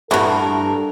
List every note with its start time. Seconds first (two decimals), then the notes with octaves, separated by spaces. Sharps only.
0.11 G2 A3 E4 F#4 A4 A#4